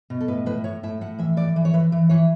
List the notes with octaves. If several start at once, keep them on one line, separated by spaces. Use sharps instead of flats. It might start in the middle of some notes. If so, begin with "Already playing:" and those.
B2
A4
A2 B4
A2 B4
A2 C#5
A2 E5
A2 F#5
E3 E5
E3 D5
E3
C#5
E3 B4
E3
E3 C#5